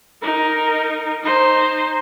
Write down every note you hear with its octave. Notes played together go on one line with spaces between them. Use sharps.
D#4 A#4
D#4 C5